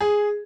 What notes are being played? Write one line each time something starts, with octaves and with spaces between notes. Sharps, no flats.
G#4